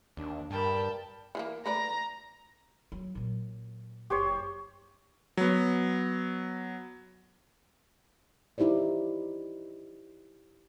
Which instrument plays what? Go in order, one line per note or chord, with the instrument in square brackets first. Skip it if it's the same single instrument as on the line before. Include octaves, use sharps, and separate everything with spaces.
[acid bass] D#2 [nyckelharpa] D4
[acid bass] G2 [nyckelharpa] A#4 B5 [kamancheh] G5 A5
[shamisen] E3 G#3 A#3
[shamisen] A3 B4 D5 [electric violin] A#5
[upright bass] F#3
A#2 F#3
[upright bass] F#1 [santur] G4 C5 C#5
[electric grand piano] F#3 B3
[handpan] D#4 E4 G4 C5 D5